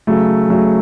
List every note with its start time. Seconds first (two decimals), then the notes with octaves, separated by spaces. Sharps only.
0.07 C#3 F#3 A3
0.49 C#3 F#3 A3